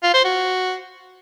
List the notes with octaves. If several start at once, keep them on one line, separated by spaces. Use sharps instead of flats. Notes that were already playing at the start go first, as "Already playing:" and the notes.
F4
C5
F#4